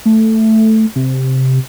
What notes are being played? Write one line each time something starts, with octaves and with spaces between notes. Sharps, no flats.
A3
C3